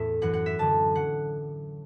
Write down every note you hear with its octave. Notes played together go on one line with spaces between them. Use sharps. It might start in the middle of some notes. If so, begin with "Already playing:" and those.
Already playing: E2 A2 E5
F#2 E3 F#5
F#5
E5
F#2 D3 F#3 A5
F#3 F#5